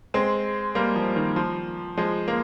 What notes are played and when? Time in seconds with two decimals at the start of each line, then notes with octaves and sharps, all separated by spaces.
0.14 G#3 C4
0.75 G3 A#3
0.96 F3
1.16 D#3
1.36 F3
1.97 F3 G#3
2.28 A#3